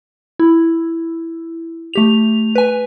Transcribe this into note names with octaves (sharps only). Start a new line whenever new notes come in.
E4
A3 G4 F7
B4 G#5